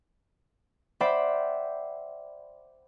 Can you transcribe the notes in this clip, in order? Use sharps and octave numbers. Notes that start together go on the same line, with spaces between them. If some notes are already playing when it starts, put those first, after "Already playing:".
C5 D5 E5 F#5 G5 B5